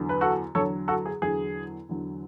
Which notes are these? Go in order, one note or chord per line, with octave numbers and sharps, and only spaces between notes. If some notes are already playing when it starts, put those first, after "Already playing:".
Already playing: E2 D3 F#3
B4
F#4 A4
E2 D3 F#3 A4 C#5
F#4 A4
G#4
E2 D3 F#3 G#4
E2 D3 F#3